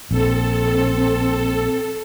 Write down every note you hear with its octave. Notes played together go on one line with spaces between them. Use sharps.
A#1 C4 A4